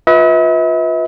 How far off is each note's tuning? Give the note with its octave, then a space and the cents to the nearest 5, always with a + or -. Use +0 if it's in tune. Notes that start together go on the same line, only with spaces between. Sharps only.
F4 +20 B4 +0 E5 -45